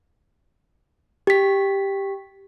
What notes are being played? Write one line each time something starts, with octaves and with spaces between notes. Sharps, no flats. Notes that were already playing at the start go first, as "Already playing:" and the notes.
G4 B6